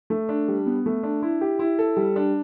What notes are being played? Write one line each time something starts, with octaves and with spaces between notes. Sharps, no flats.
A3
D4
G3
B3
A3
D4
E4
G4
E4
A4
G3
D4